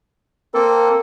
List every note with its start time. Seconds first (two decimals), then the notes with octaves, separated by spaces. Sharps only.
0.54 A#3 C4 A4 A#4